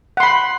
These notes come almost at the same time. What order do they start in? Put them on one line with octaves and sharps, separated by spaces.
F#5 C6 B5